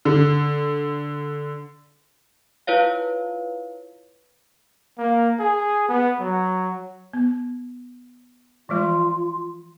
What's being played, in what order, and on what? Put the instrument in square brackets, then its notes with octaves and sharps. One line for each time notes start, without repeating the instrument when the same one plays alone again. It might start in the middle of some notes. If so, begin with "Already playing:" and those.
[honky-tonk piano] D3
[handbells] E4 F4 B4 C#5 F5
[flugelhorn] A#3
G#4
B3
F#3
[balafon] B3
[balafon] E3 F3 G#3 [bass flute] F4